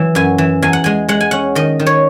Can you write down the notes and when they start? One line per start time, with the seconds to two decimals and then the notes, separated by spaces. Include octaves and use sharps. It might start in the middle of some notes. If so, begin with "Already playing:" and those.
Already playing: E3 F#3
0.15 F#2 G#5
0.38 E3
0.62 E2 G#5
0.73 F#5
0.84 G#3 G#5
1.08 G#3 F#5
1.21 G#5
1.31 C#4 F#5
1.55 D#3 D#5
1.79 D#3
1.86 C#5